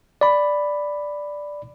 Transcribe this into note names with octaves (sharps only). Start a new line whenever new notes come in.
D5 B5